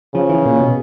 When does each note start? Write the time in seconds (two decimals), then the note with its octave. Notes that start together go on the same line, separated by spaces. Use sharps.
0.14 C#3 F3
0.29 E3
0.45 A#2
0.61 B2